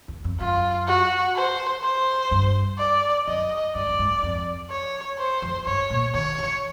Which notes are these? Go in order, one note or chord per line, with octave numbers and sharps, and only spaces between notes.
E2
F2
F#2 F4
F#4
C5
C5
G2
D5
F#2 D#5
G2 D5
G2
G#2
F2
C#5
C5
F2
G2 C#5
A#2
D#3 C#5
E3